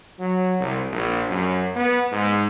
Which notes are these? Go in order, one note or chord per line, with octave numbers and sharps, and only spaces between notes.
F#3
C2
A#1
F#2
B3
G#2